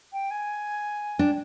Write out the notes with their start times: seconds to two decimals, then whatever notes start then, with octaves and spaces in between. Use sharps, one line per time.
0.13 G5
0.31 G#5
1.19 D4 G5